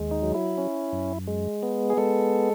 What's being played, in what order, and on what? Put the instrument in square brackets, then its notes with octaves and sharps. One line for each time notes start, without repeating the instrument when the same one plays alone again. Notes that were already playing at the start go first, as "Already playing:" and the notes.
Already playing: [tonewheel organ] D#2 G#3
D#4
F#3
E4
C#4
F#2
G#3
B3
G#4
G#3 A4